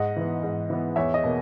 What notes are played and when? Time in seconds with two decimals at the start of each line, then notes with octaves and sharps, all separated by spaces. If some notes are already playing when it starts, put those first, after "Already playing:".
Already playing: G#2 D#5 F#5
0.16 E3 B3
0.43 G#2
0.70 E3 B3
0.96 E2 C#5 E5
1.14 D#5
1.24 B2 A#3